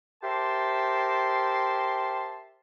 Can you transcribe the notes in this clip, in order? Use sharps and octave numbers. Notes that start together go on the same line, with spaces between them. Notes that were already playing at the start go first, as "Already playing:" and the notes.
G4 A#4 C5 E5 A5 C6